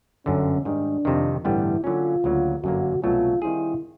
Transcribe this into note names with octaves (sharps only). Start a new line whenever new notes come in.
G1 F#2 D3 C#4
G#2 D#3 G3 D4
F2 C3 D#3
A1 G2 D3 G3 B3 E4
D3 F#3 A#3 C#4 F4
D2 C#3 F#3 A#3
G1 F#2 D3 F#3 A#3 F#4
C2 B2 F#3 A3 C#4 F4
D#3 G3 C4 E4 F4 G#4